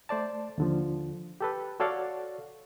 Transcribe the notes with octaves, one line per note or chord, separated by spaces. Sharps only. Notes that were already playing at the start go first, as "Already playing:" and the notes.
A3 C5 D5 A5
D#2 D3 F3
G4 A4 B4
F#4 A4 C#5 D5 F5 F#5